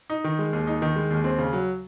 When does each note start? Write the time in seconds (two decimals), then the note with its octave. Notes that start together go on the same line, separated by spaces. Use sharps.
0.10 D#4
0.24 D#3
0.39 G#3
0.53 D#2
0.67 D#4
0.82 D#3
0.96 G#3
1.11 D#2
1.24 C4
1.38 C#3
1.53 F#3